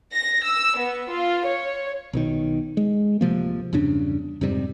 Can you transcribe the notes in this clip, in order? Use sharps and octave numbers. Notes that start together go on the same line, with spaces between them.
A#6
E6
B3
F4
C#5
B1 B2 D#3
G#3
D1 C3 F3 A#3
E2 G2 C#3 D4
F2 G#2 C3 G3